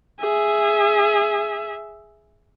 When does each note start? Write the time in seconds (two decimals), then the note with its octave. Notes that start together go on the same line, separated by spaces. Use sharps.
0.20 G#4 E5